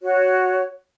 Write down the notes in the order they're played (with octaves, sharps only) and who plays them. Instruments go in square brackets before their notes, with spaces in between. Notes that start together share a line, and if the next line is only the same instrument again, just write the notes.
[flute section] F#4 C#5